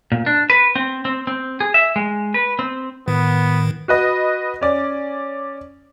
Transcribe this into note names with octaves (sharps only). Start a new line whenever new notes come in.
A#2
D4
B4
C4
C4
C4
G#4
E5
G#3
B4
C4
A2 D#3 B3
F#4 B4 D#5
C#4 D5